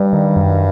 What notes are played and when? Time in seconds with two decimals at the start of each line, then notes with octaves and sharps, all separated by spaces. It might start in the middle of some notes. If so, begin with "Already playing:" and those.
Already playing: G2 G3
0.13 D#3
0.36 F#2